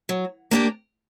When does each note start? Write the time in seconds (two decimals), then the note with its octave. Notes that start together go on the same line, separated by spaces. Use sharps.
0.09 F#3
0.51 A#3 D4 G4 A#4